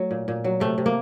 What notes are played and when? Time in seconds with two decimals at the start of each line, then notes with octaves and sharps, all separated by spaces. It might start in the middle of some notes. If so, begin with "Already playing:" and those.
Already playing: F#3 A3
0.11 A#2
0.28 A#2
0.44 F#3
0.60 C3 A3
0.78 C3
0.86 A#3